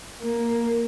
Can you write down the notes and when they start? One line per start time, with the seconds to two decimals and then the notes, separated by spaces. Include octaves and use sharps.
0.22 A#3